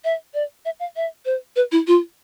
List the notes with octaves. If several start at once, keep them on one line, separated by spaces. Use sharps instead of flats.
E5
D5
E5
F5
E5
C5
B4
E4
F4